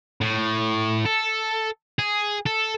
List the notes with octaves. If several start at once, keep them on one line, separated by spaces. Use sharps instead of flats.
A2
A4
G#4
A4